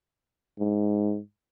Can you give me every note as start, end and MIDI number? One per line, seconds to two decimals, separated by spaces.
0.59 1.19 44